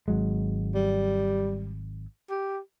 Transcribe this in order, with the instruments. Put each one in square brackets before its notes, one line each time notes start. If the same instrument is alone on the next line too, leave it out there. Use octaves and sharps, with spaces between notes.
[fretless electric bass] G#1 F#3 G#3
[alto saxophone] G3
G4